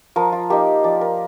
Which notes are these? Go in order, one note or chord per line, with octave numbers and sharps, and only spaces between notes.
F3 A#4
F4
A#3 D#4 G4
F3 D5
A#4